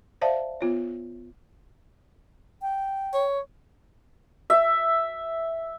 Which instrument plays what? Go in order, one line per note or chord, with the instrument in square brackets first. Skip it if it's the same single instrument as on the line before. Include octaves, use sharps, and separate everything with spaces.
[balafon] C5 D5 E5 F5 A5
B3 F4 C#5
[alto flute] G5
[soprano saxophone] C#5
[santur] E5